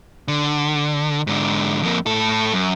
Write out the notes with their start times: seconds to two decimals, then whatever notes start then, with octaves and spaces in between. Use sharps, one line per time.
0.28 D3
1.27 G#2 D3
1.83 F2 A#3
2.06 A2 A4
2.53 F#2